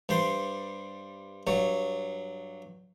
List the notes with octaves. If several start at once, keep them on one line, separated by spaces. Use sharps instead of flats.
G2 G3 C5 C6
G2 F#3 C#5